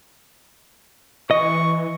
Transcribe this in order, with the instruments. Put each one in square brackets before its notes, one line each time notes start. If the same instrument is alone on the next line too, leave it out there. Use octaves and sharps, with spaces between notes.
[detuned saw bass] E3 [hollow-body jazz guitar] D#5 [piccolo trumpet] C#6